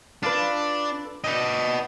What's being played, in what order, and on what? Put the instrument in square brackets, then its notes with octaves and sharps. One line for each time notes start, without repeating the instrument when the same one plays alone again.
[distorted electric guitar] D4 [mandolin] F4 A4 B4
[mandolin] C4 D4 D#4 [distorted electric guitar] B4 D#5